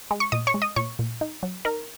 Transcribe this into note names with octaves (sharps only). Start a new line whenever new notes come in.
G#3
C#6
A#2 D#5 D#6
C#5 C#6
G#3
D#5 D#6
A#2 C#5 C#6
A#2
D#4
F#3
D#4 A#4 A#5